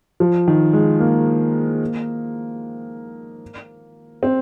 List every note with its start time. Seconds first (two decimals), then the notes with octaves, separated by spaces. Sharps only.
0.20 F3
0.48 D#3
0.73 G#3
1.00 A#3
4.23 C4